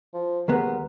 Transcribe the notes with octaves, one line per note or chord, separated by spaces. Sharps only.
F3
D#2 G#3 B3 A#4